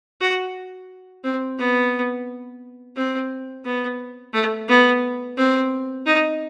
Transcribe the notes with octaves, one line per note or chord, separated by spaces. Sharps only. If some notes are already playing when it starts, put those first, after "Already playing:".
F#4
C4
B3
C4
B3
A3
B3
C4
D#4